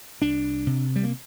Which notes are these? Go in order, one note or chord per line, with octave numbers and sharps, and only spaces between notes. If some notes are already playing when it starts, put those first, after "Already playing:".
C2 D4
C3
G3
A#3